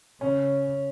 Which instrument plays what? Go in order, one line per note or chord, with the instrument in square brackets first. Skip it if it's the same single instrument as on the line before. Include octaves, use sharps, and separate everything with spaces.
[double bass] C#3 [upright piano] C#4